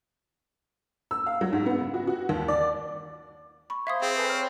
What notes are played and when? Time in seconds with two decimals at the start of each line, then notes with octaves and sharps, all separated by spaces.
1.11 E6
1.26 F5
1.41 F#3
1.53 G#2
1.66 B3
1.80 C#3
1.94 F#4
2.07 F#4
2.29 D#2
2.48 D5
3.70 B5 C#6
3.87 C5 E5 F5 C6 D#6 G#6
4.02 C4 G#4
4.16 A4 B4 G#5
4.29 C5 C#5 F6